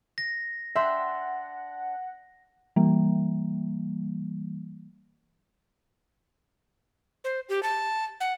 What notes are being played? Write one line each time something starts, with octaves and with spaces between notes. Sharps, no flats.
A#6
D4 E5 F#5 G5 C6
E3 G3 A#3
C5
G4
A5
F#5